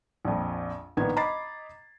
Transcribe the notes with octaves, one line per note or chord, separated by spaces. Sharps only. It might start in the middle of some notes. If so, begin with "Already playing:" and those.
A#1 F2
A#1 D#3 B3 D#4 G#6
D#5 A#5 B5 D6 A6 C7